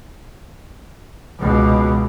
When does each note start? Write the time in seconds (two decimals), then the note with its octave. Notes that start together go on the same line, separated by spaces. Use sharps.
1.39 C#2 B2